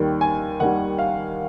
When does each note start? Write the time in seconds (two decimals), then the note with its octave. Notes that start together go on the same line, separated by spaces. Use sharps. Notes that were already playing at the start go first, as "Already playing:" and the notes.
Already playing: D#2 D#3 G3
0.21 G#5
0.60 D#2 D#3 G3 F#5
0.98 F5